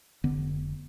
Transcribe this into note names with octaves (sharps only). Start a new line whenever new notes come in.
F1 D3 B3